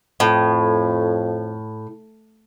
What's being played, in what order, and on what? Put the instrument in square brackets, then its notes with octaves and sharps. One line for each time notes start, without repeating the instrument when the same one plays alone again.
[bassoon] F2 [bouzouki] A2